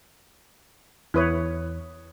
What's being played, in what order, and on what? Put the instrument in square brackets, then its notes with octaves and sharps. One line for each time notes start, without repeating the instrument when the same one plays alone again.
[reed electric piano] E2 D#6 [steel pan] E4 B4 C#5